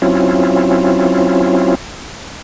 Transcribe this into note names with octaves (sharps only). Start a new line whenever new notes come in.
F#3 C4 C#4 E4 F4